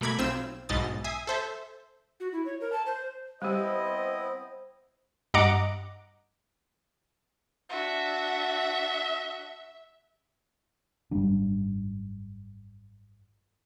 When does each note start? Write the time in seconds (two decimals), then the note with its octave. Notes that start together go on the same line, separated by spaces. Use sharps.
0.01 B2 A3 A#4 B5 D6 G#6
0.18 B1 C4 F4 C5 E6
0.69 B1 G#2 B2 D#5 A6
1.04 E5 G#5 D#6 C7
1.27 A4 C5 E5
2.20 F#4
2.32 E4
2.45 C#5
2.61 A#4
2.72 A5
2.86 C5
3.42 G3 B3 C4 E4 G4 C5 D#5
5.34 G2 D#5 F#5 A#5 D6 D7
7.70 D4 F#4 E5
11.11 G#1 F#2 G3 D4